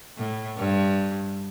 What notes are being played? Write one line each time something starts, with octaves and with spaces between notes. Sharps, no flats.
A2
G2